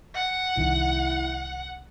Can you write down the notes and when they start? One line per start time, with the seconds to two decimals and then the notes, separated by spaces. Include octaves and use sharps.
0.14 F#5
0.57 C2 D#3 E4